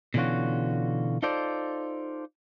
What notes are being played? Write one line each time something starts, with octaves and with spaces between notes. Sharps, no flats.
B2 D3 E3 C#4 F4 F#4
D#4 F4 A4 C5 D5